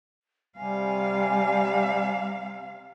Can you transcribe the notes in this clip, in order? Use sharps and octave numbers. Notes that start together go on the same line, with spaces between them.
C3 G3 F5 G#5